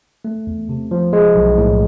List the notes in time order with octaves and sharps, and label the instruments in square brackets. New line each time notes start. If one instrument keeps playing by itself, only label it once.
[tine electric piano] A3
E2
C3
F3
G#3
B1
A2